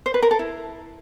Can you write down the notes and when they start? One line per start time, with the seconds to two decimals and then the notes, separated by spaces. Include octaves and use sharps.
0.06 C5
0.14 B4
0.22 A#4
0.31 A4
0.39 E4